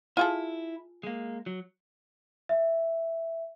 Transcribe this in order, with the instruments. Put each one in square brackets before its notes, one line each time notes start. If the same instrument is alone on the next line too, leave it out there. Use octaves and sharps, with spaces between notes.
[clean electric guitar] E4 [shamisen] F4 G#4 A4
[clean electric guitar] G#3 A#3
F#3
[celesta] E5